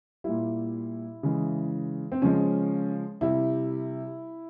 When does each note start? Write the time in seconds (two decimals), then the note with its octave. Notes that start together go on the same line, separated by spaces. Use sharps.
0.24 A#2 G3 E4
1.23 C#3 E3 G#3
2.12 C4
2.22 C#3 F3 G#3 C#4
3.21 C3 G3 E4